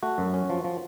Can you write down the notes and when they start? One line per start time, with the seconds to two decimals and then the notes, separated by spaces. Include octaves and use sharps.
0.03 A3 F#4
0.18 F#2
0.34 C#4
0.50 F3
0.64 F3